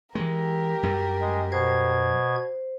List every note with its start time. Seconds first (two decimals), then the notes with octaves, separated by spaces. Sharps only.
0.15 E3 G#3 G4 A#4
0.83 F#2 F#3 G3
1.21 G#3
1.52 B2 C5 G#6